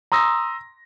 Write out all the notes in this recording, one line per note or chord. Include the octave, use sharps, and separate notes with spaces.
A#5 C6 D#6 E6 A#6